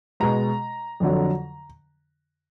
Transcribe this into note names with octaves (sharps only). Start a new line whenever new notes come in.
B2 G#3 A#5
F2 D3 F#3